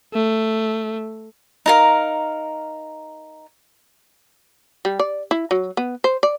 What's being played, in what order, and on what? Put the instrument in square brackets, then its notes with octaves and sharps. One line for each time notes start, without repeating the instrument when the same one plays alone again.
[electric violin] A3
[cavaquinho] D#4 A#4 F5
[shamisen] G3
D5
E4
F#3
B3
C5
D5